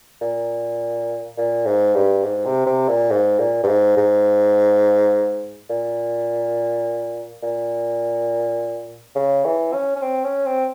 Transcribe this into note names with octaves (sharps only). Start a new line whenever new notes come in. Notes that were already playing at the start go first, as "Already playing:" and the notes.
A#2
A#2
G#2
G2
G#2
C3
C3
A#2
G#2
A#2
G2
G#2
G#2
A#2
A#2
C#3
E3
C#4
C#4
C4
C#4
C4